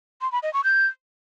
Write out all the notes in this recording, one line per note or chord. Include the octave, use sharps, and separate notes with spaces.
C6
B5
D#5
C#6
G6